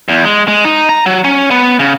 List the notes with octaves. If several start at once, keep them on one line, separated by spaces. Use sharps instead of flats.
E2
G#3
G#3
D#4
A#5
F#3
C#4
B3
C#3